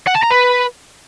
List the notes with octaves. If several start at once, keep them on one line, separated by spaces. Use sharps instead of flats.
F#5
A5
A#5
B4